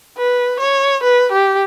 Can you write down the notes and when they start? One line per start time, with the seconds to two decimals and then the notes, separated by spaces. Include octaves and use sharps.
0.17 B4
0.60 C#5
1.03 B4
1.32 G4